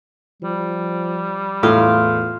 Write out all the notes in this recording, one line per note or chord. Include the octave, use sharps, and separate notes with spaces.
F3 G3
E2 A2 F4